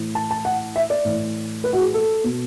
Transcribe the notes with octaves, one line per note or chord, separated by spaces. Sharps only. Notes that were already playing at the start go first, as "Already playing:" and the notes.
Already playing: A2 E3
A5
A5
F#5
E5
D5
A2 E3
B4
F#4
G#4
A4
B2